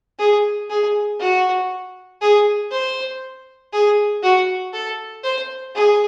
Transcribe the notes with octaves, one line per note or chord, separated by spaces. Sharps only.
G#4
G#4
F#4
G#4
C5
G#4
F#4
A4
C5
G#4